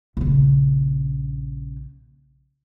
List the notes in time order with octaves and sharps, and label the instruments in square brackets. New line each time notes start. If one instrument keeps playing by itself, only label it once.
[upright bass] A#1 C#3